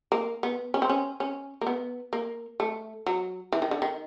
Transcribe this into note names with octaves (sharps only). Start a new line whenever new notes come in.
A#3
B3
C#4
C4
C#4
C#4
A#3
B3
A#3
A3
F#3
E3
D#3
D3
D#3